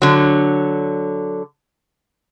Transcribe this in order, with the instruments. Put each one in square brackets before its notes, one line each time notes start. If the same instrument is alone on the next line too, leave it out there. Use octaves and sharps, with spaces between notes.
[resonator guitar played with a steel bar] D3 F#3